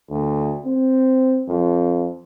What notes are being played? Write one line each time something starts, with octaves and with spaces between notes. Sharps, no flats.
D2
C4
F2